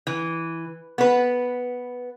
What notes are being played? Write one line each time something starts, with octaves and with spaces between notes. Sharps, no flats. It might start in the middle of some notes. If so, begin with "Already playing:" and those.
E3
B3 B4